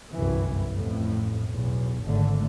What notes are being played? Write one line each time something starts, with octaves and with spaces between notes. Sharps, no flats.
G1 C2 F#2 E3
A1 F2 A2
B1 E2
G#1 G#2 D3 A3